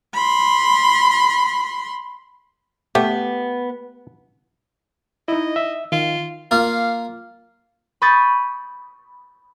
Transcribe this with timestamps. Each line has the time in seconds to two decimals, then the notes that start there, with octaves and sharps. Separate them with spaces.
0.14 B5 C6
2.95 A3 B3 G4
5.28 D#4 E4 D#5
5.56 E5
5.92 D#3 F4
6.51 A#3 F4 F5
8.02 B5 C#6 D#6 G6 A6